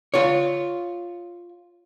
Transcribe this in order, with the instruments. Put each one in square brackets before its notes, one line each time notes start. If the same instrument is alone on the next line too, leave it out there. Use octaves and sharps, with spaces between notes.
[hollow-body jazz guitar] F4 C#5